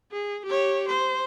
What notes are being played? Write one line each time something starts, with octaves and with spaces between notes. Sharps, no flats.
G#4
G4 C#5
C5